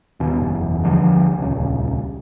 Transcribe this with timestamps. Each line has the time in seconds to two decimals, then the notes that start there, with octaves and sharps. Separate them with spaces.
0.20 D#2 B2
0.41 F#1 E2
0.85 D#2 D3 F3
1.38 D#1 C#2